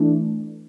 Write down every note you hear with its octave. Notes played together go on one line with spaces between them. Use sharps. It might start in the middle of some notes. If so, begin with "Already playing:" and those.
Already playing: E3 A3 D4